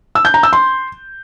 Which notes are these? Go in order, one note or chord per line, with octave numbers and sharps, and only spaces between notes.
E6
G6
A#5
E6
C6